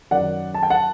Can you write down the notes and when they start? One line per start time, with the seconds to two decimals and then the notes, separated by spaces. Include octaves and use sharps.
0.11 F#2 D#3 D5 F#5
0.54 A5
0.63 G5
0.70 F#5 A5